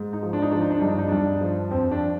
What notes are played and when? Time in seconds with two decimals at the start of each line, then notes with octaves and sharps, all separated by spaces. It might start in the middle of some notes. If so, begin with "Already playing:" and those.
Already playing: G#2
0.13 D#4
0.23 F3
0.33 D4
0.42 D#4
0.51 F3 D4
0.61 D#4
0.71 D4
0.80 G2 D#4
0.89 D4
0.99 D#4
1.08 G2 D4
1.41 F3
1.71 F2 C4
1.91 D4